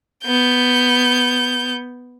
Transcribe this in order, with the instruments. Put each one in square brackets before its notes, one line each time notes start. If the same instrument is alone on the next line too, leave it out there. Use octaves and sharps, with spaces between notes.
[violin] B3 G6